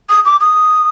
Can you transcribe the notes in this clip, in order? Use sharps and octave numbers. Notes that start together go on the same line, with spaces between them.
D#6
D6
D#6